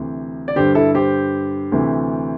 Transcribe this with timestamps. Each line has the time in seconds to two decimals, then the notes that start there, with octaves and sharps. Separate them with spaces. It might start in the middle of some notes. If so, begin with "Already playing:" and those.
Already playing: D2 C3 E3
0.48 D5
0.56 G2 D3 G4 C5
0.75 E4 A4
0.95 G4 C5
1.72 D2 C3 E3